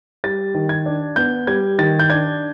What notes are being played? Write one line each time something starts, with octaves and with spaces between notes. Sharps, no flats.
G3 A6
D#3
G#6
D4
B3 G6
G3 G#6
D#3 A6
G6
D4 G#6